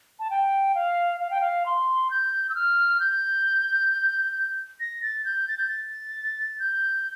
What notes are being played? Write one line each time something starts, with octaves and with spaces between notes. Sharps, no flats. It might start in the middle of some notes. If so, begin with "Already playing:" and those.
A5
G5
F5
F5
G5
F5
C6
G6
E6
F6
G6
A#6
A6
G6
A6
G6
A6
G6